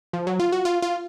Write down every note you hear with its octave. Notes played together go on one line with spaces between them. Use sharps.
F3
F#3
F4
F#4
F4
F4